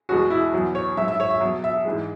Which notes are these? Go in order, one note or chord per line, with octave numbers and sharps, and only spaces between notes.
E2 B2 G#3 F#4
E4
E2 B2 F#3
C#5
G#2 F#3 E5
E5
C#5
E5
B2 F#3
E5
G#2 E3 G#3